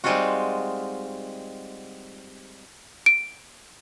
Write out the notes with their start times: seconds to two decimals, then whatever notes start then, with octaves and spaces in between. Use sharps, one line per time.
0.04 G3 G#3 C4 D#4 F4 F#4
3.06 D7